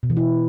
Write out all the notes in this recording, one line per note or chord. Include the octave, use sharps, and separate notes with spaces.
B2
E3
E4